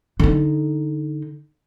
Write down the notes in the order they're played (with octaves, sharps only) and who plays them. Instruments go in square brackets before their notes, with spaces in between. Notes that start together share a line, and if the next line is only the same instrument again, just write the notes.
[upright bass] D3 D#4